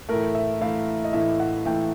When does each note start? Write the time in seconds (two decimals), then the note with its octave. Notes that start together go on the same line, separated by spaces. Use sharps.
0.09 A2 E3 A3 A#4
0.35 E5
0.61 A2 E3 A3 F5
1.04 D#5
1.13 A2 E3 A3 E5
1.40 F#5
1.65 A2 E3 A3 G5